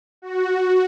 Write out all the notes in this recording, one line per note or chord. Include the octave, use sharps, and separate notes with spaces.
F#4